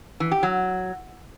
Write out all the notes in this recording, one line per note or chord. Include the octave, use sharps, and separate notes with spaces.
E3
G4
F#3